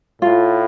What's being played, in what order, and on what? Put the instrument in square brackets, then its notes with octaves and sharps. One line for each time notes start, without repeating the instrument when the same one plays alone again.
[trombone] A2 [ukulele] F4